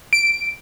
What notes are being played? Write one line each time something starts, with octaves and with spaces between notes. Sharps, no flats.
D7